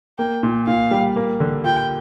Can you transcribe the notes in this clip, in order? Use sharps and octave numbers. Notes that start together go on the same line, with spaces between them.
A#3 G5
A#2
A#2 F5
G3
A#3
D3
F4 G5